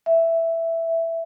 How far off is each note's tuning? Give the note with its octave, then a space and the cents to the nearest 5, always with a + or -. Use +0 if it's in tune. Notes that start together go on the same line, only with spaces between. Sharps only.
E5 +5